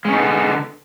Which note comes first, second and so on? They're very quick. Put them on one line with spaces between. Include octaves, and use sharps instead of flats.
G#3 C#4 D#4 B3 D3